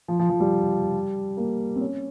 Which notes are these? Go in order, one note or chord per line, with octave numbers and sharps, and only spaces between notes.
F3
F3
F3
G3
A#3
C4
C#4